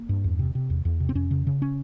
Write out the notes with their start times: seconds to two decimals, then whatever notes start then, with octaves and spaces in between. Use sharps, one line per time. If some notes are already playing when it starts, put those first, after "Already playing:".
Already playing: A#3
0.09 G2
0.24 E2
0.39 C3
0.55 C3
0.70 E2
0.85 E2
1.00 C3
1.09 C4
1.15 F2 C#4
1.31 C#3
1.47 C#3
1.62 C#4